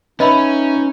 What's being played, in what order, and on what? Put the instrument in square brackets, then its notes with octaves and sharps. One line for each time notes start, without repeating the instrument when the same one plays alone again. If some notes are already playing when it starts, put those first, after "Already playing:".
[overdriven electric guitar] C#4 [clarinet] D#4 [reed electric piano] B4 E5 [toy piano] D#5 B5 C6